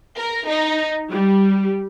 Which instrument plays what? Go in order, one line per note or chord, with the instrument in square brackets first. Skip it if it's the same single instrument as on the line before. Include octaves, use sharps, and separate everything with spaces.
[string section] A#4
D#4
G3